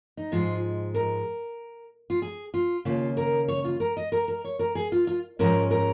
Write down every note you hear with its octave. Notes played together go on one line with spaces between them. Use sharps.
D#4
G#2 F3 G#3 F4
A#4
F4
G#4
F4
D#2 C#3 A#3 F4
A#4
C#5
F4
A#4
D#5
A#4
A#4
C#5
A#4
G#4
F4
F4
G#2 F3 G#3 C#4 A#4
A#4